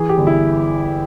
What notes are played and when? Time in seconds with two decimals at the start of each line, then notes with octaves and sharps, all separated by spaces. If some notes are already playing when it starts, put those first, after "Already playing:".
Already playing: E3 G#4
0.09 G4
0.18 G1
0.27 E4